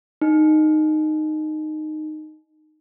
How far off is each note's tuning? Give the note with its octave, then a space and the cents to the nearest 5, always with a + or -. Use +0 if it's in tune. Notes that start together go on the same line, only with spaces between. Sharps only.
D#4 -10